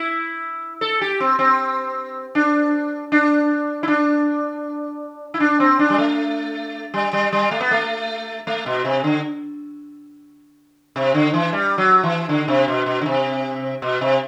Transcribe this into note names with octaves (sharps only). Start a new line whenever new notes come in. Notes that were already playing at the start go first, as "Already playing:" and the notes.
Already playing: E4
A4
G4
C4
C4
D4
D4
E4
D4
E4
D4
C4
D4
G3
A3
G3
G3
G3
A3
B3
A3
A3
B2
C3
D3
C3
D3
E3
G3
F#3
E3
D3
C3
B2
B2
D3
C3
B2
C3